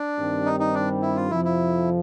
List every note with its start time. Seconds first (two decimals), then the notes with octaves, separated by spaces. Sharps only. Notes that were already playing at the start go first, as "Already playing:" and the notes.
Already playing: D4
0.17 G2 D#3 G3 C4
0.46 D#4
0.60 D#4
0.74 D4
1.02 E4
1.16 F4
1.30 F2 C3 F3 E4
1.45 E4